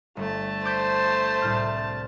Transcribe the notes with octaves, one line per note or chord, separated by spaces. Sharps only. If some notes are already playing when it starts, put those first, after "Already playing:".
G1 A3 A5
C5 D6 G6 B6
C2 A2 F6